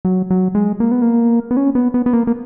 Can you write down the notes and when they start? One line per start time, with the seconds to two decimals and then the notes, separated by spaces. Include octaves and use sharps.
0.05 F#3
0.31 F#3
0.55 G#3
0.80 A#3
0.92 B3
1.02 A#3
1.51 B3
1.57 C#4
1.75 B3
1.94 B3
2.06 B3
2.13 A#3
2.27 A#3